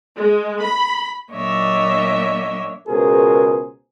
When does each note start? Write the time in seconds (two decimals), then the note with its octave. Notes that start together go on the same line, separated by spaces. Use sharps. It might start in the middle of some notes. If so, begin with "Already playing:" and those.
0.18 G#3
0.62 B5
1.32 A#2 F#3 D4 C#5 D#5 E5
2.88 C#2 B2 G#4 A#4 C5